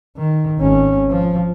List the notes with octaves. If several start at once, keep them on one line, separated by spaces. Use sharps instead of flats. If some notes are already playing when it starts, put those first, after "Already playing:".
D#3
G#1 C#4
F3